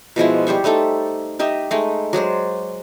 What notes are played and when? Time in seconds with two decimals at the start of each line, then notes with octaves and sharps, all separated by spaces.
0.16 B2 F3 G#3 E4
0.47 G3 G4 C5 C#6
0.64 G3 A3 D#4 A4
1.39 D#4 G4 D#5 E5
1.71 G#3 A3 D#4
2.13 F#3 G#3 C5 D5